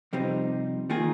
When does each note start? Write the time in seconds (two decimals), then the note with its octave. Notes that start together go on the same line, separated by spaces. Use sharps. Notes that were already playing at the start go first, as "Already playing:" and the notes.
0.13 F2 C3 G3 C4 D#4
0.90 D#3 A#3 F4 G#4